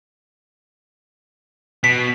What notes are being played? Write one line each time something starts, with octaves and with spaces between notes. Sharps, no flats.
B2 B6